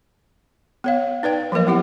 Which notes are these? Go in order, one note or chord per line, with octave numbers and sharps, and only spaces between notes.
B3 C#5 F5
D#4 B4 D5 G5
F3 F#3 A#3 A#4 D#5
B3 E4 G4 F#5